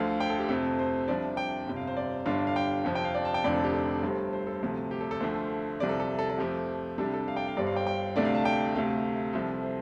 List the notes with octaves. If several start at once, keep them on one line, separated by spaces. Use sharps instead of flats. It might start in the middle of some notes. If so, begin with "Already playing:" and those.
Already playing: D2 D3 F3 F5
G5
A4
G4
F2 C3 A3 C4 A4
C5
C2 C3 F3 D4 D5
G5
G1 F2 C3
F5
C5
D5
G1 G2 D3 G3 D4 F5
F5
G5
F2 C3 F3
G5
F5
D5
A5
G5
F1 F2 D3 F3 D4 D5
A4
G4
A4
G1 G2 G3 C4
C5
A4
D2 C3 F3
G4
A4
A4
D2 D3 F3 A3 C5
C2 C3 F3 D5
A4
A4
A4
A4
F2 F3 A3 G4
C2 C3 G3 D4 A4
G4
A4
F5
G5
F5
G1 G2 G3 C4 D5
F5
G5
G5
D2 C3 A3 D4 D5
F5
A5
G5
D2 C3 A3 F5
C2 C3 F3 A4
C5